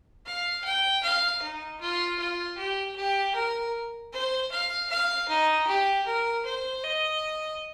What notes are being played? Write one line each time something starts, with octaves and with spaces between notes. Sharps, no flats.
F5
G5
F5
D#4
F4
F4
G4
G4
A#4
C5
F5
F5
D#4
G4
A#4
C5
D#5